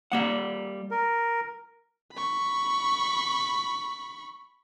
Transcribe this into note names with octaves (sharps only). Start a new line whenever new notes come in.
G3 A#3 F#5
A#4
B5 C#6